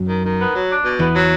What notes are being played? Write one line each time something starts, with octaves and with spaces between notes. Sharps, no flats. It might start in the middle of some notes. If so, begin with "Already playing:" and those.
Already playing: F#2 F#3
D#3
D#3
B3
F#3
D4
B2
E2 E3 B3
F#3